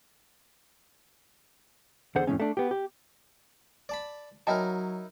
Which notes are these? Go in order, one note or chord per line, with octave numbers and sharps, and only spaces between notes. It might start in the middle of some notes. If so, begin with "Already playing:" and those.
E2 D3 G#4 C5 F#5
F2 A2 D#3 C#4
A3 D4
B3 G4
G4
D5 A5 B5
F#3 D#4 E4 A#4 D#5 G5 A5